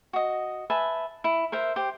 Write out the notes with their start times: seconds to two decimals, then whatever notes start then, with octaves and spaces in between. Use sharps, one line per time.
0.13 F#4 D#5
0.70 B4 E5 G#5 A5
1.24 E4
1.52 A#4 C5 E5
1.76 G4 C5